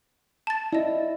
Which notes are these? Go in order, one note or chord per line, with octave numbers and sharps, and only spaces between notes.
A5 A6
E4 D5 D#5